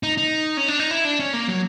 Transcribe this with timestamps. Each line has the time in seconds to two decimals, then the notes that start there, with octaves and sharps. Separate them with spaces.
0.03 D#4
0.17 D#4
0.57 C#4
0.68 D4
0.79 D#4
0.91 E4
1.05 D4
1.19 C#4
1.33 A#3
1.48 F#3